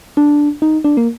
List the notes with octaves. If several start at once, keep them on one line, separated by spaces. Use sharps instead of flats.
D4
D#4
D4
A#3